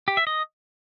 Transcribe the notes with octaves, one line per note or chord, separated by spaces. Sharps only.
G4
E5
D#5